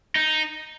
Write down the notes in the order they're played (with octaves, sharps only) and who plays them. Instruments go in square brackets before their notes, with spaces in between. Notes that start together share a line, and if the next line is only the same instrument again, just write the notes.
[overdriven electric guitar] D#4